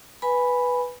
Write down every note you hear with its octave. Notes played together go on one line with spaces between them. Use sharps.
B4 G#5 B5